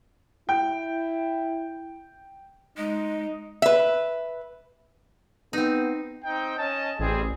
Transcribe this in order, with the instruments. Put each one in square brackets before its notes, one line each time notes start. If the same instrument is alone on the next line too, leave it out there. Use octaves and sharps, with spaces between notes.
[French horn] E4 [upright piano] G5
[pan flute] G#3 [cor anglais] D#4
[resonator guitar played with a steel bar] B4 E5
[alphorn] B3 [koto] C4 D#4
[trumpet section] C4 D#4 G5
C#4 D#5 A5
[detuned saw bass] A1 [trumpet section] G3 C4 G#4